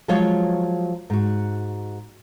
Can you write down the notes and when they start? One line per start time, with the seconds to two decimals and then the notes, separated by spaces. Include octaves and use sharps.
0.08 F3 F#3 G#3 F4 F#4 C#5
1.10 G#2 F#4